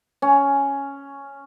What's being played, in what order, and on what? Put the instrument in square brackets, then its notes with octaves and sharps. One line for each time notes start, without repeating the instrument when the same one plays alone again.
[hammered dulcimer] C#4